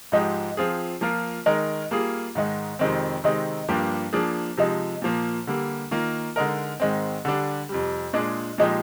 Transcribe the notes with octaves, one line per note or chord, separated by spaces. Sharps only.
G#2 F3 G#3 D#4 G4
F3 C4 F4 G#4
F3 A#3 F4 A#4
D#3 G#3 D#4 A#4
G3 A#3 F4 G#4
G#2 D#3 G#3 D#4
F2 C3 D#3 G#3 C4
C3 D#3 G#3 C4 D#4
G2 F3 A#3 D4 G4
F3 A#3 D4 G#4
C3 F3 G#3 D#4
A#2 F3 A#3
D3 G3 A#3
D#3 A#3 F4
D3 G#3 D#4 A#4
G#2 D#3 G#3 C4
D3 G3 D4
F2 C3 G3
A#2 G#3 D4 G#4
A#2 F3 G#3 D#4 G4